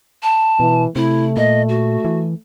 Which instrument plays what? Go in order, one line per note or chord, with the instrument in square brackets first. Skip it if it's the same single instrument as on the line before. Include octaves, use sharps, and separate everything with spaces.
[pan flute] A5
[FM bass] B2 [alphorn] E3
[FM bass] C3 [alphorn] A3 [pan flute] E4
[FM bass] A#2 [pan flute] D#5
[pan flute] F#4
[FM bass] E3